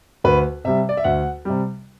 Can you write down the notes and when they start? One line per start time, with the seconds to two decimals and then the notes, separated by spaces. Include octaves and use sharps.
0.24 D2 B4
0.65 C3 G3 E5
0.89 D5
0.97 E5
1.04 D2 F#5
1.45 C3 G3